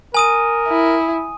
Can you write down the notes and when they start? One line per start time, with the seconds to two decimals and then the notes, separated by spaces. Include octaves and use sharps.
0.14 A#4 G#5 D#6 D#7
0.69 E4